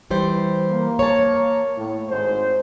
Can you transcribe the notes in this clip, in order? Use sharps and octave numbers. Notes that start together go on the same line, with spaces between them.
E3 G3 C5
A#3
C#5 A5
A2
G#1 G#2 C5